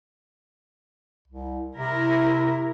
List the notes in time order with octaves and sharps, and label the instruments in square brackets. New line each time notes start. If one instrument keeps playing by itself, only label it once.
[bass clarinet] C2
[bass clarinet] C3 [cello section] E4 A#4